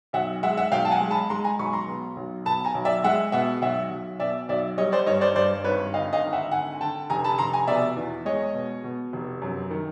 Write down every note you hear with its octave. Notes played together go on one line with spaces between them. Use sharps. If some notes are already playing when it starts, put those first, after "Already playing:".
B1 E5 F#5
G#3 E5 F#5
E5 F#5
B1 F5 G5
A5
F#5 G#5
G#3
A5 B5
G#3 A#5 C6
G#5 A#5
B1 B5 C#6
A#5 C6
B2
B1
B2 A5 B5
G#5 A#5
B1
D5 E5
G#3 E5 F#5
B2 E5 F#5
B1 E5 F#5
B1
B2 D5 E5
B1 D5 E5
G3 C#5 D#5
C5 D5
G2 C#5 D#5
C5 D5
G2 C5 D5
G#1 B4 C#5
D3 D#5 F5
D#5 F5
G#1
E5 F#5
D3 F#5 G#5
D3 G5 A5
F1 G#5 A#5
A5 B5
F1 A#5 C6
G#5 A#5
B2 D5 E5
E2
G#3 C#5 D#5
B2
B2
F1
F#2
D#3